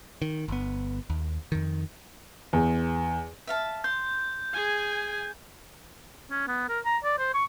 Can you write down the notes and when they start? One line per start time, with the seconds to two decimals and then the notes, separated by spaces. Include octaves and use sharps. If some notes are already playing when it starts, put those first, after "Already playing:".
0.22 D#3
0.48 G1 B3
1.10 D#2
1.52 F2 D#3
2.53 E2
3.47 E5 F5 A5
3.84 C6 G6
4.53 G#4 G#5
6.31 C#4
6.48 B3
6.69 A#4
6.85 A#5
7.04 D5
7.18 C5
7.34 C#6